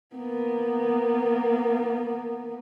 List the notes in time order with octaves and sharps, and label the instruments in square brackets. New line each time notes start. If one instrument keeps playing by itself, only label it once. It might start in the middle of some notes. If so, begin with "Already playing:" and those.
[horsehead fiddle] A#3 B3